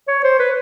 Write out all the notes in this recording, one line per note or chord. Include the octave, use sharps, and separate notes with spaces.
C#5
C5
B4